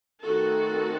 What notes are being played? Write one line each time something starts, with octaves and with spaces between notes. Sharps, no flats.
D#3 A3 C4 F#4 A4